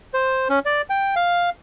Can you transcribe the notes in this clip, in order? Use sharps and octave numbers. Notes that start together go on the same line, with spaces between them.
C5
C#4
D5
G5
F5